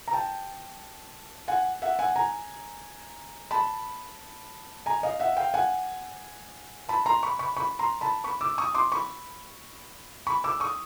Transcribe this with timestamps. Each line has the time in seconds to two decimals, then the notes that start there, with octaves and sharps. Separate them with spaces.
0.08 A#5
0.13 G5 A5
1.48 F#5 G#5
1.82 E5 F#5
1.99 F#5 G#5
2.16 G#5 A#5
3.51 A5 B5
4.86 G#5 A#5
5.03 D#5 F5
5.20 E5 F#5
5.37 F5 G5
5.54 F#5 G#5
6.89 A5 B5
7.06 A#5 C6
7.23 B5 C#6
7.39 B5 C#6
7.57 B5 C#6
7.79 A#5 C6
8.01 A5 B5
8.24 B5 C#6
8.41 D6 E6
8.58 C#6 D#6
8.75 C6 D6
8.92 B5 C#6
10.27 B5 C#6
10.44 D6 E6
10.60 C#6 D#6